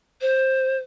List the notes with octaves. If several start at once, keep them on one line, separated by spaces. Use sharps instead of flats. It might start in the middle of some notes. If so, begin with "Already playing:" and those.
C5